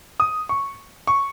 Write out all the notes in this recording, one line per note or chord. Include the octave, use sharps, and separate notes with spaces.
D#6
C#6
C#6